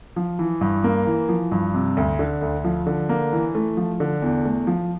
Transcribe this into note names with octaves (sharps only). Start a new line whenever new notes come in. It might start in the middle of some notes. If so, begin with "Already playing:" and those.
F3
E3
G2
A#3
E3
F3
G2
C3
D2
D3
D2
F3
D3
A#3
E3
A3
F3
D3
E2
A3
F3